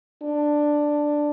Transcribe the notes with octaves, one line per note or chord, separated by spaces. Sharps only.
D4